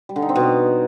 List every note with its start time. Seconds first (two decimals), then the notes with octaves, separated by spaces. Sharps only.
0.09 G3
0.16 D3
0.22 D#4
0.29 C4
0.36 B2